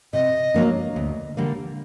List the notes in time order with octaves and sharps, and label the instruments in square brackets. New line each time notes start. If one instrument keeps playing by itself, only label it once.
[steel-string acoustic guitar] C3 [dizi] D#5
[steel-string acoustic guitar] F#3 A#3 D4
D2
D3 G3 A#3